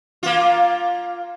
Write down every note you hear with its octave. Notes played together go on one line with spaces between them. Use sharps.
A#3 F4